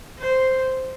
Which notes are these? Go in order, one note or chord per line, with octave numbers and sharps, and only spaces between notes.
C5